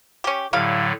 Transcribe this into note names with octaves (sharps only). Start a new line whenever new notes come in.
C#4 G4
A2 D3 F#3 G3 E4 F5